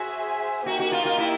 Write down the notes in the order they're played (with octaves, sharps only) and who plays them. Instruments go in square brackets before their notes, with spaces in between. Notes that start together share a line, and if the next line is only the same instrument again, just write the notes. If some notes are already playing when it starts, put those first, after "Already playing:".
Already playing: [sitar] F#4 [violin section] G#4 C5 E5 G#5
[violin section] A#3 D#4 G4 [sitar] F#4
[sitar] F#4
F4
F4
E4